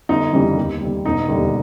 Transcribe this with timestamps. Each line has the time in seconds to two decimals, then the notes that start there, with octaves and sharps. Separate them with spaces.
0.09 G1 D#4
0.33 F2 C#3 E3 G3
0.57 D#2
0.81 D#3 G3
1.05 E1 D#4
1.28 D#2 D3 G3